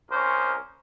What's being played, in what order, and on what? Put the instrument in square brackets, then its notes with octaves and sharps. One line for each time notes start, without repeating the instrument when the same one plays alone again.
[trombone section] C2 C#4 A#4 C5